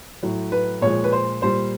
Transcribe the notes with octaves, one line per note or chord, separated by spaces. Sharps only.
A2 F#3
B4
A#2 F3 G#3 C#5
B4
C5
A#2 G3 C5